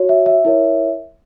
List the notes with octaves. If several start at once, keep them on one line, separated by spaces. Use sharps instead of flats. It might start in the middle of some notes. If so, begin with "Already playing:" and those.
Already playing: F#4 C#5
E5
E5
E4 A#4 C#5